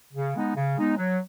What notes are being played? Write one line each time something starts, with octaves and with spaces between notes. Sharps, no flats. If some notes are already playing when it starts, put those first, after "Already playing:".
C#3
G#3 B3 D#4
C#3
G#3 B3 D#4
F#3